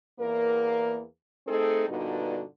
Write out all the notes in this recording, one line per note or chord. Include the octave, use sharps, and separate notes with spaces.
E2 A#3 A#4
A3 C4 D#4 G#4 A4
G2 A#2 D3 B3 D#4 F#4